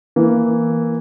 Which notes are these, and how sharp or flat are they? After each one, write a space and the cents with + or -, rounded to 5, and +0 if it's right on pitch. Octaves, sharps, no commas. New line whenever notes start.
E3 -5 A#3 +0